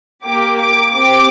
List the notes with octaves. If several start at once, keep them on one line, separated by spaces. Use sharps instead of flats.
A#3 G4 D6
D6
C4 G4 D6